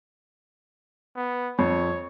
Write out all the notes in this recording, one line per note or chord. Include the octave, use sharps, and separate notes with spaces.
B3
F2 C#5